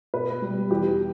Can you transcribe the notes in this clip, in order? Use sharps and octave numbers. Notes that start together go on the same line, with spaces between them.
B2 B4
G3
E2 G4